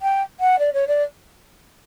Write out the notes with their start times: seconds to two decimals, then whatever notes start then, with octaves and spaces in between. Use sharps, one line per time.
0.01 G5
0.40 F#5
0.59 D5
0.73 C#5
0.87 D5